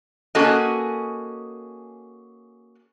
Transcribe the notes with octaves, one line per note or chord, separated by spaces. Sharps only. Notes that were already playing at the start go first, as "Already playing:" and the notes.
A#3 C#4 F#4 G#4 A4 D#5